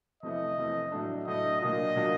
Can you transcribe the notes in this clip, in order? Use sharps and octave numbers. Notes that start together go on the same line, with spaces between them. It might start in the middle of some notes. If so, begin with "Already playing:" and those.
F2 C3 E3 A3 D#5
F2 C3 E3 A3
A2 F#3 A3 D4
A2 F#3 A3 D4 D#5
A#2 F#3 A#3 D4 F4 D#5
A#2 F#3 A#3 D4 F4